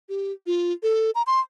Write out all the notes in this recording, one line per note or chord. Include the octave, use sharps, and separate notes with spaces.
G4
F4
A4
A#5
C6